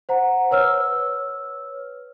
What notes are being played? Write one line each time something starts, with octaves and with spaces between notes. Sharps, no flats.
C5 F#5 A#5
B4 C#5 E6 F6